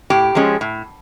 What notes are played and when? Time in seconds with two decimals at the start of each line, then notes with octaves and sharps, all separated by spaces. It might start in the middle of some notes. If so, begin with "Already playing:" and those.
0.10 A2 G4
0.35 F3 G#3 C#4
0.61 A2